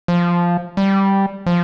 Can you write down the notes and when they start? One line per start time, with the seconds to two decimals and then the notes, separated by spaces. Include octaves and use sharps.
0.08 F3
0.77 G3
1.46 F3